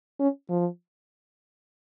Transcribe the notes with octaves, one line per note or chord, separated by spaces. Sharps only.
C#4
F3